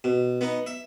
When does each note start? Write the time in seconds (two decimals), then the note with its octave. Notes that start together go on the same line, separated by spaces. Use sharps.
0.04 B2
0.41 B3 D#4
0.66 E5